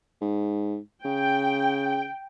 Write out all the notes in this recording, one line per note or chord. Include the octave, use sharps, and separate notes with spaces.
G#2
C#3 G5